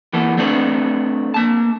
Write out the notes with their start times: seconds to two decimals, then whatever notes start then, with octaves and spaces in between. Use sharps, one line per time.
0.13 E3 A#3 B3 A4
0.37 A3 C4 D4 A4 B4
1.34 A#3 A5